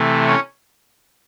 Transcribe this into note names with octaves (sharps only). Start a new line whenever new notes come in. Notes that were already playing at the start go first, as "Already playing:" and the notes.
Already playing: C3 E3 A3
C#4 C#5